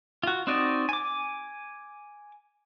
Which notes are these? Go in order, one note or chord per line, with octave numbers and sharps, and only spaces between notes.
F4 F#4
C4 D#4 F#4 D5 D#5
G#5 D6